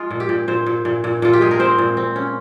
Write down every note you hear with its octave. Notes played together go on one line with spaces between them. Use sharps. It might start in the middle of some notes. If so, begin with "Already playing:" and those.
Already playing: G#3 F4
A#2
G4
A#2
A#2 C5
A#2
A#2
A#2
A#2 F4
G4
G#3 G#4
A#4
C4 C5
A#2
C4
C#4